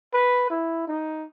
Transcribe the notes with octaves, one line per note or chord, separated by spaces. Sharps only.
B4
E4
D#4